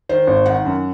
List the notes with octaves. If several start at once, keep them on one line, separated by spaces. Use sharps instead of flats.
D#3 C5
G#1
D#3 F#5
F#2